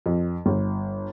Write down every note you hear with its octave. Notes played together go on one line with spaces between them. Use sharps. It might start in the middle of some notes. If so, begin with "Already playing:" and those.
F2
G1